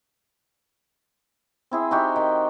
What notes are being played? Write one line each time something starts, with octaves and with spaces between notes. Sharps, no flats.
C4 E4 G#4
D#4 F#4 G4
D#3